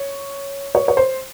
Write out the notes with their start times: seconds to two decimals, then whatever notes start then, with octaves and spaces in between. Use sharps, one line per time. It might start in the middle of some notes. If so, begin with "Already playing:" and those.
Already playing: C#5
0.75 C#5
0.88 C#5
0.97 C5